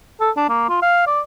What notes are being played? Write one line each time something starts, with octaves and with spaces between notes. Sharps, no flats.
A4
D4
A#3
F4
F5
D5